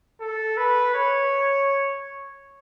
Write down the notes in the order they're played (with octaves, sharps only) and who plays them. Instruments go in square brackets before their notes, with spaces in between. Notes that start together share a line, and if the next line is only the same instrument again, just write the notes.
[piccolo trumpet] A4
B4
C#5